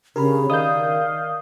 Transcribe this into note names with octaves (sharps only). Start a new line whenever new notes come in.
C#3 D4 G4 A#4 B5
D#3 A#4 D5 D#5 F5 D#6 G6